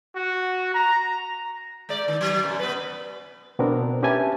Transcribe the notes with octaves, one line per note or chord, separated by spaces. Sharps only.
F#4
A#5
G#3 D5
D#3
F#3
F#2 B2
B3 B4
B2 B3 C4 D4 A#4
C#4 G4 B4 E5 G#5 A5